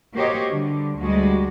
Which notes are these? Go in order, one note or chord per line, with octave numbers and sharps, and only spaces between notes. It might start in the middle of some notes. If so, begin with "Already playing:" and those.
A#3 F#4 G4 C5 C#5 D#5
D3 G3
D2 G3 G#3 F#4